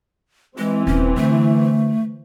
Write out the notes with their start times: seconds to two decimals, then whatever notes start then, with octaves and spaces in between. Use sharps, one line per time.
0.58 E3 G#3 C4
0.87 D#1 C#4
1.16 D3 A3